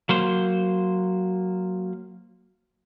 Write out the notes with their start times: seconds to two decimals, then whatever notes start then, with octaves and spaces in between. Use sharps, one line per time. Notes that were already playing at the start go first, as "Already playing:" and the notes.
0.09 F#3 A#3 C5